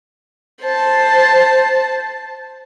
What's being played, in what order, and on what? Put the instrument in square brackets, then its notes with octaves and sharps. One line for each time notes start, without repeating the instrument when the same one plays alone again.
[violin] C5 A5